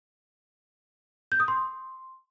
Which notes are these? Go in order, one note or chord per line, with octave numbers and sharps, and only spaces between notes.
G6
D#6
C6